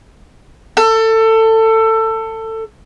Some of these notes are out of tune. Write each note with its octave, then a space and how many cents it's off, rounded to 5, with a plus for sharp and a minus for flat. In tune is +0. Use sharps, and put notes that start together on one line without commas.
A4 +20